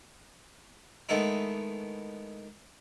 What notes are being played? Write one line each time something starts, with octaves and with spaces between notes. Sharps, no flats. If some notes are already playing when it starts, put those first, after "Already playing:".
D#3 G#3 A3 B3 D#4 E4